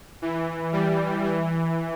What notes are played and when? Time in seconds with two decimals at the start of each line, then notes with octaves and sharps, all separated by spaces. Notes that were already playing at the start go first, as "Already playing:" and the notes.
0.22 E3
0.73 G3
1.24 E3